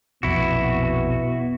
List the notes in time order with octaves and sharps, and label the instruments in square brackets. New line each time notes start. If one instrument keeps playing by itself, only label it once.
[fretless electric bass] A#1 F2 [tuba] B2 [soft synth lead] B3 [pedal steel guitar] E4 F#4